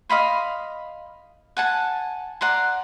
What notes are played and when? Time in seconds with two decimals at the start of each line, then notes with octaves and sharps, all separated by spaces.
0.09 D#5 F5 B5 C6
1.57 F#5 G#5 A5
2.41 D5 F#5 A#5 C6